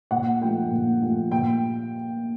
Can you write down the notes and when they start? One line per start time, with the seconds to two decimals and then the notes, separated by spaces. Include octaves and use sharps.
0.11 A#2 F#5
0.41 F3 A3 G5
0.71 A#2
1.02 F3 A3
1.32 A#2 G5